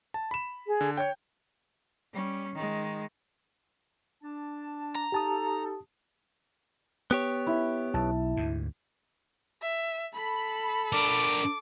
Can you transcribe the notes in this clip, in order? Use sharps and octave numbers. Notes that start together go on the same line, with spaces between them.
A5
B5 E7
G#4
D3
C#5 G5 G6
G3 C#4
D#3 G#3
D4 A5
A#5
D#4 G4 A4 A5 D#6
B3 G4 C#5
E4
B1 E4 A5
D2 G#2
E5
A4 B5
D4 A#4 D6